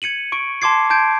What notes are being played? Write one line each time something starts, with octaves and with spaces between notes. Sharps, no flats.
G#6 C#7 D#7 F#7
C#6 D7
A5 C6 D6 G#6 C7
A5 G6 G#6 D7